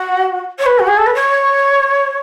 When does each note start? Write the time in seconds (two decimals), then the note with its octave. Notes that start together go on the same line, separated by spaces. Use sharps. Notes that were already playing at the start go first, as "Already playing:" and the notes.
Already playing: F#4
0.58 C#5
0.66 B4
0.78 F#4
0.87 G#4
0.97 A4
1.06 B4
1.14 C#5